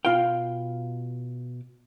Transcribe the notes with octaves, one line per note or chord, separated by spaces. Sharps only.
B2 F4 F5 G5